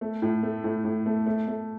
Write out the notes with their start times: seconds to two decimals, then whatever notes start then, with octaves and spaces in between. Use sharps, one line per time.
0.01 A3
0.22 A2
0.43 A3
0.64 A2
0.85 A2
1.06 A3
1.26 A3
1.48 A3